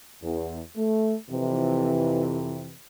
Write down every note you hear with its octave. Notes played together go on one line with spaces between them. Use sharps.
E2
A3
F2 C3 E3